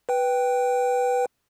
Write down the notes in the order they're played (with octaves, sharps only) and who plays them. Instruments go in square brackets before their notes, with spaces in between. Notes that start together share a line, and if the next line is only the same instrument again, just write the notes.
[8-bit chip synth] B4 G5